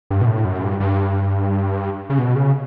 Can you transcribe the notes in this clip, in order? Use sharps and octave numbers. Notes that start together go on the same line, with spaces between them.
G2
B2
A2
F#2
G2
G2
C#3
B2
C#3